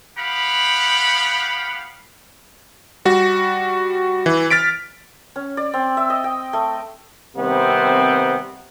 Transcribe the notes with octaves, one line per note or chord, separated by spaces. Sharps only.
B3 G4 F5 F#5 B5
G3 F#4
E3
F6 A6 B6 D7
C#4
D5
C4
E5
D#5
G5
A3
C3 D#3 G3 B3 C4